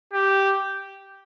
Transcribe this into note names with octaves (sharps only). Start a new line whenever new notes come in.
G4